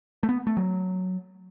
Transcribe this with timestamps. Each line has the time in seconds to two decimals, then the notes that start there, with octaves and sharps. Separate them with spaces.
0.23 A3
0.29 B3
0.47 A3
0.57 F#3